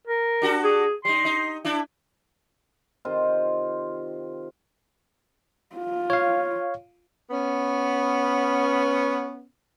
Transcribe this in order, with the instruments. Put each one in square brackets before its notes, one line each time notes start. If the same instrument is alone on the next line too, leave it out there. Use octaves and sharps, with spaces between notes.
[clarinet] A#4
[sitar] D4 F#4 G4
[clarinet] G#4
[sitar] G3 D#4 [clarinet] C6
[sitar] D#4
D4 E4
[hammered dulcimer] C3 D#3 F4 C5
[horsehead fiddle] F4
[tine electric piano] C#5 F5
[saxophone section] B3 C#4